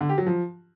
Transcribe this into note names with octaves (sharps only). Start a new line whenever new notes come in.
D3
G4
F#3
F3